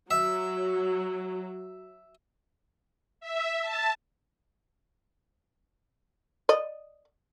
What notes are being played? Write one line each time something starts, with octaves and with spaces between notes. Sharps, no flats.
F#3 E5
E5
A5
D5 D#5